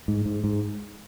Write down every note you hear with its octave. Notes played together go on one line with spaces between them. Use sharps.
G#2
G#2
G#2